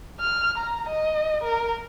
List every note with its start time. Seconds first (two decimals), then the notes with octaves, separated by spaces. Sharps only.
0.20 F6
0.58 A#5
0.89 D#5
1.43 A#4